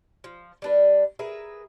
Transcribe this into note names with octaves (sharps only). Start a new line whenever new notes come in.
F3
G3 D4 B4
G#4 A#4 B4 E5